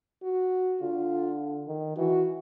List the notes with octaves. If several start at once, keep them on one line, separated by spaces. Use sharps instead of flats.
F#4
D3 F4
D#3
E3 F#4